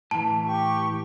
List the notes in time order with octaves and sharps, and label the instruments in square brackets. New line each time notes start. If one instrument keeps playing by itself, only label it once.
[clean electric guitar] A2 E3 [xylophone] A5
[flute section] G4 C#6